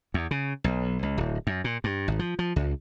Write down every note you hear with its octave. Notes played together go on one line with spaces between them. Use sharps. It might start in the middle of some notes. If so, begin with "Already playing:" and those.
E2
C#3
B1
C#2
D1
F#2
A#2
G2
G#1
F3
F3
C#2